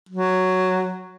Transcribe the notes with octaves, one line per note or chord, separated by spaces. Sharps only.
F#3